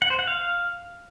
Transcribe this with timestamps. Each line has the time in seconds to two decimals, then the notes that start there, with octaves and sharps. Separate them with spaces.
0.02 F#5
0.10 C5
0.19 F#5
0.27 F5